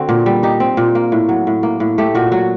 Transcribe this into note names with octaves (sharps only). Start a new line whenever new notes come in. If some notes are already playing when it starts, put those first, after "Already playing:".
Already playing: D3 C4 F#4
A#2
G3
D#4 G4
C4
A#2
A#3
A2
F#3
A2
A#3
A2
A3 G4
A#2 F#4
F#3 F#4